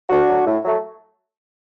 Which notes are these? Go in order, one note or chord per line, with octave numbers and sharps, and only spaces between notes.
D2 D4 F#4
D3 F#3
A2
F#3 A3